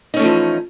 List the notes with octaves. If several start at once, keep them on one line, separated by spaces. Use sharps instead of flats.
E3 F3 A3 C#4 D#4